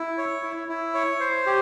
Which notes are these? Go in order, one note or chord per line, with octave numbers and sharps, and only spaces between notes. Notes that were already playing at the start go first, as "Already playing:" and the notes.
Already playing: E4
C#5
E4
E4
C#5
C5
G4